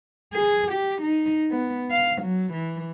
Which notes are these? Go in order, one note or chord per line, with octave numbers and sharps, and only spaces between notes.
G#4
G4
D#4
B3
F5
F#3
E3